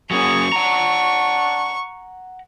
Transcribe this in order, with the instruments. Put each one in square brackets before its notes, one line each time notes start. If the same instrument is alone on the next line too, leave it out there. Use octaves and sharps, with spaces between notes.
[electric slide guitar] F#3 A#3 C#4 [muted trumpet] G#4 [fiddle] C#6
[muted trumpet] D4 [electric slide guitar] F#5 A#5